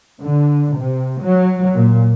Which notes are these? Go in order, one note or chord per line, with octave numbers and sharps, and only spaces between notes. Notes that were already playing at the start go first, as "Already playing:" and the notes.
D3
C3
F#3
A#2